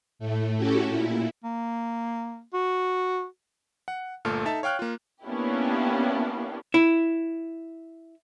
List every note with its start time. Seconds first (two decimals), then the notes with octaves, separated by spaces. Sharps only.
0.19 A2 A3
0.57 C#4 E4 F#4 G4 A4
0.88 A#2 E4
1.44 A#3
2.54 F#4
3.88 F#5
4.25 G1 A#2 A3 A4 F6
4.45 D#4 A4 E5 A5
4.63 C#5 F5 G5 F6 F#6
4.79 A#3 F4
5.24 A#3 B3 C#4 D4 E4 G4
6.74 E4